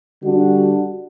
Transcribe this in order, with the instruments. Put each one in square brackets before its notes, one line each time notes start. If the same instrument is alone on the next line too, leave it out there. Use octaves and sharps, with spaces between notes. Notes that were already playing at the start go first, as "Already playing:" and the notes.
[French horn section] D3 G3 D4 F#4